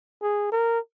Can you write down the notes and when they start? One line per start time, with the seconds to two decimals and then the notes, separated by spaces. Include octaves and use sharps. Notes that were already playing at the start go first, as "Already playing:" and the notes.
0.22 G#4
0.52 A#4